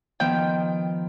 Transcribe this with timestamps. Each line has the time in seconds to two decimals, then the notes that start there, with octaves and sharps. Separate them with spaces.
0.20 D#3 F3 B3 G5